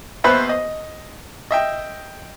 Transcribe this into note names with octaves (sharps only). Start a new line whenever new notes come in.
D#2 B3 B4 C5 E5 B5
D#5
D#5 E5 G5